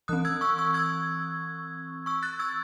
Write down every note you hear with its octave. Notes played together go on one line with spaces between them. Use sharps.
E3 C4 D#6 F#6
E6 G#6
C#6 E6
C#6 E6
E6 G#6
C#6 E6
F#6 A6
E6 G#6